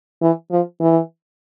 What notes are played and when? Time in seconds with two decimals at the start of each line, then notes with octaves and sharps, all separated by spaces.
0.22 E3
0.51 F3
0.81 E3